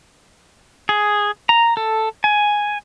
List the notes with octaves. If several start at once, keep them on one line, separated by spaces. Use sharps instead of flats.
G#4
A#5
A4
G#5